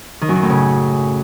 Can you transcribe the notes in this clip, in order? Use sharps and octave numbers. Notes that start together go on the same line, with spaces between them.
D#3
F#2
D#3
A2
C#3